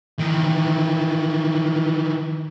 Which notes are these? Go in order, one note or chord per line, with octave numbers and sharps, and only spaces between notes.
D#3 E3